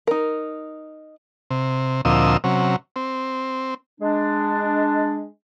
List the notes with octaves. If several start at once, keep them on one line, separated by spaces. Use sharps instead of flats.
D#4 A#4
C3
D2 A#2 F3 C4 D#5 E6
C3 F#3 C#4
C4
G#3 D4